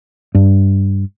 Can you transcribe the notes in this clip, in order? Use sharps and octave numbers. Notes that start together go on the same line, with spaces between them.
G2